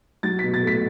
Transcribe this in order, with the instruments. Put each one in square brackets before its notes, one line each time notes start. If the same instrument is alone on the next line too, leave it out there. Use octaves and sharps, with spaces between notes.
[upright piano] F#3 A6
B2 B6
A6
A3 B6